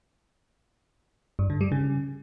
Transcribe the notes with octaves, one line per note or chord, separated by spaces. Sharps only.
G2
D3
G3
C#3